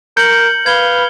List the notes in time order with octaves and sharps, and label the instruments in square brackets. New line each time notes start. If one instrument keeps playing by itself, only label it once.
[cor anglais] A#4 [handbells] G6 [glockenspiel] C#7 F#7
[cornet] B4 [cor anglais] F5 [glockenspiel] G#6 G7